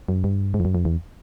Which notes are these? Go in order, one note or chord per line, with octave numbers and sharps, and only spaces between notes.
F#2
G2
G#2
F2
F#2
F2
E2